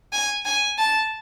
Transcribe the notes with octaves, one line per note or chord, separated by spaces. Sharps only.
G#5
G#5
A5